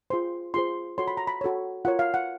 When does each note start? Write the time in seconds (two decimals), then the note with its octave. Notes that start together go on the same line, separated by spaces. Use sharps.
0.10 F4 G#4 C5 C6
0.54 F4 G#4 C5 C6
0.98 F#4 A4 C#5 C6
1.08 B5
1.17 A#5
1.27 B5
1.41 F#4 A4 C#5
1.85 F4 A#4 C#5 F#5
1.99 F5
2.14 F#5